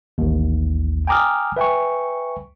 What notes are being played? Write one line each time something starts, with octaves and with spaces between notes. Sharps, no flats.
A1 D#2
G5 G#5 A#5 D6 D#6 F6
B4 E5 G5 G#5 C#6